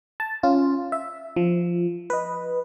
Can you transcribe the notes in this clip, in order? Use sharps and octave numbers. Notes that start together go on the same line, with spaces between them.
A5
C#4 F4
E5
F3
B4 D#5